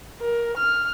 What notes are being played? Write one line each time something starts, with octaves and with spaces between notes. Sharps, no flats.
A#4
F6